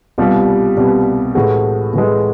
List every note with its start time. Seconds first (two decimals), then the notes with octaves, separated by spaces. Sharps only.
0.18 C2 B2 G3 F4 G4
0.77 C2 B2 G3
1.35 A2 E3 G#3 F#4 G#4
1.94 A2 E3 G#3